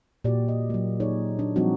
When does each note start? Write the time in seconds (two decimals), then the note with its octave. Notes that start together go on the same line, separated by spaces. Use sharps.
0.24 A#2 F#4 G4 D5
0.48 D#5
0.70 F#3 A#3
1.00 D#4 G#4 C#5 D5
1.39 D4
1.56 F3 G3 C4 D#4 F#4